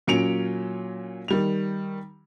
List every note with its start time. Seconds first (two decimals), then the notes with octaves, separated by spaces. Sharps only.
0.07 A#2 F#3 C#4 C#7 D7 F7
1.28 D#3 G3 F7